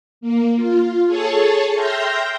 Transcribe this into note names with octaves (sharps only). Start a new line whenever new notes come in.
A#3
F4
G#4 A4 C#5 A5
E5 G5 C6 F6 G6 A#6